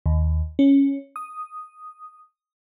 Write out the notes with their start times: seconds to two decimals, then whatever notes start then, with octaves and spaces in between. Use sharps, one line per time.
0.06 D#2
0.59 C#4
1.16 D#6